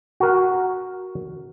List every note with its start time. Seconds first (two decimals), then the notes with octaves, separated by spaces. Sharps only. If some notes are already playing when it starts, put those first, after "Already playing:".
0.20 F#4 A#4